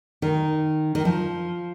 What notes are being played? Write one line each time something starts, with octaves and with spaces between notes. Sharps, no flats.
D#3
D#3
F3